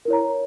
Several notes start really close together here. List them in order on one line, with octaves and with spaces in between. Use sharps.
A#4 E4 C#5 A#5